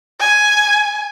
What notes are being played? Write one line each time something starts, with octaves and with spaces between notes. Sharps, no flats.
G#5